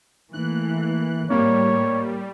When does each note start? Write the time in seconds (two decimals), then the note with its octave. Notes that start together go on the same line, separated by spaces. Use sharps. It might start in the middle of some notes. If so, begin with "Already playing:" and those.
0.33 E3 A3 A#3 F#6
1.30 A2 G3 A#3 C#5